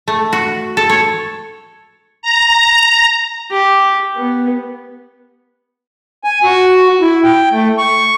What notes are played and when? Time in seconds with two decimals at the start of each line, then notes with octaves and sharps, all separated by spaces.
0.08 A3
0.33 F#4
0.77 A4
0.90 C#5
2.22 A#5
3.51 G4
4.17 B3
6.24 G#5
6.44 F#4
7.01 E4
7.24 G5
7.52 A3
7.78 C#6